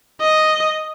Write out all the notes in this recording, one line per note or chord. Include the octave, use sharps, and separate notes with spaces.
D#5